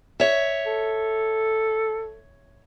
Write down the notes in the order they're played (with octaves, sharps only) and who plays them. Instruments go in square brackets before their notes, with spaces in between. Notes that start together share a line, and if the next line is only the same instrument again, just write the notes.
[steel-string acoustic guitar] C#5 E5
[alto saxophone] A4